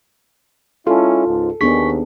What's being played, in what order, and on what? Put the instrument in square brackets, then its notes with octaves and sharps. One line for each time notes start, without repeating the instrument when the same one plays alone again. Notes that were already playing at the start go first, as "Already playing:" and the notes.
[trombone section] G#3 C#4 E4 [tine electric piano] F4 [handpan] A4
[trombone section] C#2 G#2
[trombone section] D#2 [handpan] B3 D4 G#4 [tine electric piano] C#6 B6